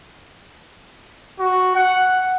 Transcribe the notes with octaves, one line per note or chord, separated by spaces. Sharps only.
F#4
F#5